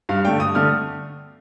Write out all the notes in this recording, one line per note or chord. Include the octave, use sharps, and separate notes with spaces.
G2 F5
D3 A3 D4 G5
G2 D#6
D3 A3 D4 F6